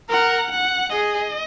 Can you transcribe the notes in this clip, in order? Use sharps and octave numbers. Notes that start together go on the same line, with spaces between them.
A#4 F#5
F#5
G#4 D#5